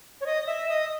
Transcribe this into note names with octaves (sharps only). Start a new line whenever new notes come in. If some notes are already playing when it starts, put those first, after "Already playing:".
C#5
D#5
E5
D#5